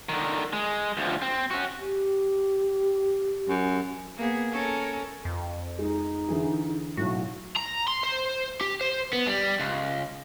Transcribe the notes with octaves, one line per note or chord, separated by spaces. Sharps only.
D3 D#3
G#3
D2 F3
C4
C#4 F#4
G4
F#2
A#3 B3 G#4
C#4 A4 A#4
F2
G#3 D#4
D3 E3 G#4
B1 A2 F#4
A#5
C6
C5
G4
C5
B3
G3
C#2